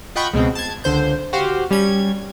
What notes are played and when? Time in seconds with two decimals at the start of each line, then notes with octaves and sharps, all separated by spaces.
0.15 F4 D#5 F#5 G5 B5 C#6
0.34 C#2 B2 G#3 C4
0.55 A5 G#6
0.84 C#2 D3 C5 G6
1.33 F#4 G4 C5 F5
1.71 G3 C#4 G#6